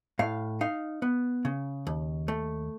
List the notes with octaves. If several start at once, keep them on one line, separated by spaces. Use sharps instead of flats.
A2 F5
D#4 F5
B3
C#3
D#2
A3